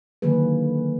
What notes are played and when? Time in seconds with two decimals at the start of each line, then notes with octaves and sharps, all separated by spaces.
0.22 D3 D#3 F#3 A#3 G#4 B4